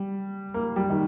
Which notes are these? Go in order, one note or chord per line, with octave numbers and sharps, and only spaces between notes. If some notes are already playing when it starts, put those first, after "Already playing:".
Already playing: G3
A#3
G3
D#3